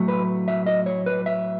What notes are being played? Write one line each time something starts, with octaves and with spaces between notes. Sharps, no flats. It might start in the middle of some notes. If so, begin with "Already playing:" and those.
Already playing: A2 F#3 A3
B4
E5
D#5
C#5
B4
E5